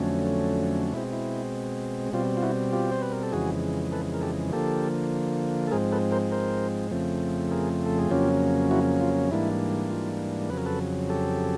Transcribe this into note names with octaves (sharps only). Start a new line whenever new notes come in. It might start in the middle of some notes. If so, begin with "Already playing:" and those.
Already playing: F2 D3 F#3 A3 C#4
B2 G#3 C4 E4
E4
B2 G3 C4 F4
F4
E4 F#4
F4 G4
C5
B4
A#4
A4
F2 C#3 E3 G#3 F#4 G#4
A4 B4
A#4
G4 A4
D3 F3 A#3 G4 A4
A4
G#2 F3 G#3 C4 G#4 A#4
A4 B4
A#4 C5
A#4 C5
F2 C#3 F3 A3 C4
G#4 A#4
A4
G#4
F2 C#3 F#3 A#3 C#4 F4 G4
E4 F#4
F4
G#2 E3 G3 A#3 D4 E4
F4
F2 C#3 F#3 B4
A#4
A4 B4
G4 A4